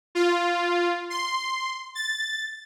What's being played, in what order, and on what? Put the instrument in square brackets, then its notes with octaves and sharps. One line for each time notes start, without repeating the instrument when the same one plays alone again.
[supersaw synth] F4
C6
A6